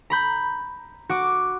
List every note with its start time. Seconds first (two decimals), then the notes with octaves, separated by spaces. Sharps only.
0.10 A#5 B5 G6
1.09 F#4 D6